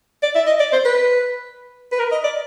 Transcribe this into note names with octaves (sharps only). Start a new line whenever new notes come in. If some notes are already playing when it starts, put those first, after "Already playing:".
D5
E5
D#5
D5
C5
B4
B4
A#4
D#5
D5